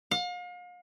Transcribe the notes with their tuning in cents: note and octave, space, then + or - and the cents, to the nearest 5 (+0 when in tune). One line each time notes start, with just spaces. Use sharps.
F5 +40